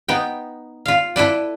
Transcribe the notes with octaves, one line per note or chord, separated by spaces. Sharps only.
B3 D#4 G5
F4 F5
E4 A4 B4 D5